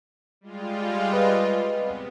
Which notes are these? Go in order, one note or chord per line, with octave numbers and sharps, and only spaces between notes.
G3 G#3 F4
B4 D#5
C3 B3